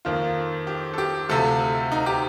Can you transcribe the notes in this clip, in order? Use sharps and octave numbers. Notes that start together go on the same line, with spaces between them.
F2 D#3 A#3 F4
G4
A4
G4
D2 C3 F3 A4
D#4
G4